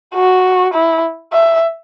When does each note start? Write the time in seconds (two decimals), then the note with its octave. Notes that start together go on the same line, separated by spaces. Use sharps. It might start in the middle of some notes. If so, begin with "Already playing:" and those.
0.14 F#4
0.74 E4
1.33 E5